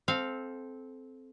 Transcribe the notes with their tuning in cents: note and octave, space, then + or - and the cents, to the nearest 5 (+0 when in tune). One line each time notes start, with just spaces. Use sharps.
C4 +0 A4 -20 F5 +0